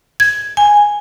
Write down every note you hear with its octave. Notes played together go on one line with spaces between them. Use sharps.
G#6
G#5